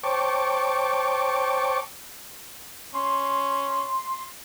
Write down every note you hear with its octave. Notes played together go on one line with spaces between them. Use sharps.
C5 C#5 G5 A5 C#6 D6
C#4 C6